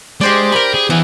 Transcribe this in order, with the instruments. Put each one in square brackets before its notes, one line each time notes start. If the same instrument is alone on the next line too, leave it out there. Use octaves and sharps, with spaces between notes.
[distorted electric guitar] G#3 [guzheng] G4 C5 D5
[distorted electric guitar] G#4 A#4 [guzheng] G5 B5
[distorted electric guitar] G#4
[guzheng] E3 [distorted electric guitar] B3 G#4